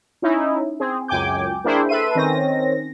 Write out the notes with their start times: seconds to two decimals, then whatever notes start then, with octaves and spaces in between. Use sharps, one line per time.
0.22 C#4 D#4 E4
0.80 C4 G#4
1.08 C#2 F#2 G5 G#5 D6 G6
1.64 A#3 D4 E4 G#4 C5 G5
1.89 A4 B4 E5 C6 D#7
2.15 D#3 C4 C#4 A#6